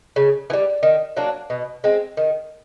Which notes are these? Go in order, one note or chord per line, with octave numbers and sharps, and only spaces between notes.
C#3
E3
G3
D#3
F#3 A#3 D4
B2
G#3 C4
D#3